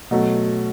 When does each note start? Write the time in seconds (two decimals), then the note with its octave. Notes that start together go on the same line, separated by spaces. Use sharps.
0.11 B2 F#3 A3